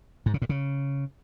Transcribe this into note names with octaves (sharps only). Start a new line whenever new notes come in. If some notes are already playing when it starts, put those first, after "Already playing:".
G#2
C#3
A2
C#3